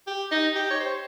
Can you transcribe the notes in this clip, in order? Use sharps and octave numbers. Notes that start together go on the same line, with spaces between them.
G4
D#4
G4
C#5
C5